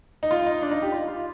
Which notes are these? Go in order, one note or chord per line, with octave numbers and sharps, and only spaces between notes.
D#4
F4
D#4
D4
D#4
G4
F4
F4